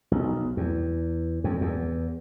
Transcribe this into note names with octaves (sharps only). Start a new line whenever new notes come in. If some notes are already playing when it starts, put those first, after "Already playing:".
B1
E2
F2
E2